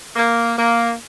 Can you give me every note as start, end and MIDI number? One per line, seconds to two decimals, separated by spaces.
0.15 0.52 58
0.56 0.92 58